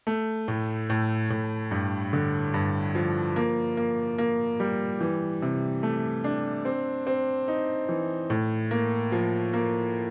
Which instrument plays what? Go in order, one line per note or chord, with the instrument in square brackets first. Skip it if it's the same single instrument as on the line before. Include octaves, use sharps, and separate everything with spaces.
[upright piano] A3
A2
A2
A2
G2
D3
G2
F3
A#3
A#3
A#3
G3
E3
C3
A3
D4
C4
C4
D#4
E3
A2
A#3
F3
A#3